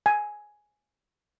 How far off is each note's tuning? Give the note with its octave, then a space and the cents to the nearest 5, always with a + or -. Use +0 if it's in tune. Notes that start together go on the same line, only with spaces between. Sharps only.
G#5 +5